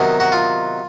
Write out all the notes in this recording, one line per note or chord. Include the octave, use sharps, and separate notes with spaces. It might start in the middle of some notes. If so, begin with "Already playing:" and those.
Already playing: C3 D#3 F#3 B3 D#4
F#4
F4